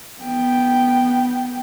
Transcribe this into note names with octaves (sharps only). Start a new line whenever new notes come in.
B3 G5